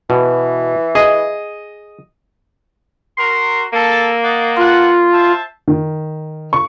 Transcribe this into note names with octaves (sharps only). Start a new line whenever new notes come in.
B2 E3
G#4 D#5
F#4 A#4 C6
A#3 A4
D5 D#5 F#5
F4 A4 B4 F#5
C5 E5 A5
D#3
C#6